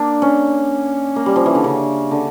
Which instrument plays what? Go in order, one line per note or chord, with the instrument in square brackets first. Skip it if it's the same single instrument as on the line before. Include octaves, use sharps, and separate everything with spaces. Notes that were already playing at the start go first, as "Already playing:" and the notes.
Already playing: [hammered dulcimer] A#3 D4
C#4
A#3
G3
F3
E3
D3
C#3
D3